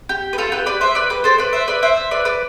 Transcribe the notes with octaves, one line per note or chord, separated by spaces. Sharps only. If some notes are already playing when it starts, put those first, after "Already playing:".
G4
B4
F4 A4
G4 B4
B4 D5
C5 E5
B4 D5
G4 B4
A4 C5
B4 D5
C5 E5
B4 D5
C5 E5
B4 D5
B4 D5